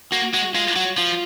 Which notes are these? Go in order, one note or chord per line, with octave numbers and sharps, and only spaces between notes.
A#3 F#4
G#3 F#4
G#3 F4
F#3 F#4
F3 F4